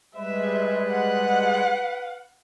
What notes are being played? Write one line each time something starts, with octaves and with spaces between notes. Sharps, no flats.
G3 G#3 B4 E5
F#5